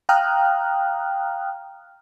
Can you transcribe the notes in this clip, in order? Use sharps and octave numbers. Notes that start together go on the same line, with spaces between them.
F5 G5 A#5 D#6 F6 F#6